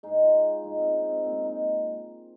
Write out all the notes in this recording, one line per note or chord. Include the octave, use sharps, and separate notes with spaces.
G#2 G#3 D#4
F4
G#2 G#3 D#4
C4
D#4
C4
A#2 G#3 C4
D#4